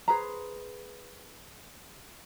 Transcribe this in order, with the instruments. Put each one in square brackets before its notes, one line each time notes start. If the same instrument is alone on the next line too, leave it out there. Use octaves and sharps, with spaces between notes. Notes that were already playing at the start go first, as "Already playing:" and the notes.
[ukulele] G#4 B4 C5 A#5